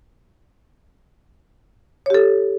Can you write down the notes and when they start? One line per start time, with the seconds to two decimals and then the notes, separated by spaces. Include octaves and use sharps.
2.06 C#5
2.10 G4
2.14 A4